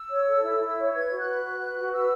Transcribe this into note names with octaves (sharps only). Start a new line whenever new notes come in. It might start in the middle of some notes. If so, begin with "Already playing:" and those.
Already playing: E6
C#5
A4
E4
E4
C#5
B4 G#6
F#4
F#6
B4
F#4
B4
F#4
B4 E6